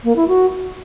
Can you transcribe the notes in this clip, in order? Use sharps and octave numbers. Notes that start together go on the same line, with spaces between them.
A#3
E4
F#4